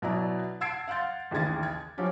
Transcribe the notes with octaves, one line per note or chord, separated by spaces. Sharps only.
B2 F#3 E4 D5 A#5
F#5 A5 E6 G#6 C7 D7
F5 F#5 C6 G6 A6
A1 D#2 C#3 G#6 A6
G#6
F3 F#3 C#4 G4